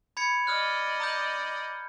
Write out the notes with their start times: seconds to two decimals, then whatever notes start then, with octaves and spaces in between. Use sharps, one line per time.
0.17 B5 G#6 C#7
0.47 D5 D#5 D#6 F6 F#6
1.00 A#5 D#6 G6